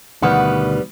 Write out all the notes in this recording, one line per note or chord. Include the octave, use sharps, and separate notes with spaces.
D2 B2 D#3 G3 B4 F#5